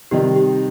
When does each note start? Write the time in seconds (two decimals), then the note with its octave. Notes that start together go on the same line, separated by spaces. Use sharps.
0.11 C3 D#3 G3 D#4 G4
0.36 G4